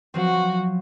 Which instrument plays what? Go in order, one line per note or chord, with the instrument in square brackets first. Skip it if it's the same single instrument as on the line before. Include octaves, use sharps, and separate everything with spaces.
[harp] F3 F#3 C4 [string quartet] F#4